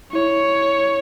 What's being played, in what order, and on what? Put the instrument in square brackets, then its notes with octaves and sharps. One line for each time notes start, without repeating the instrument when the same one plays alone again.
[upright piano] E4 [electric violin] C#5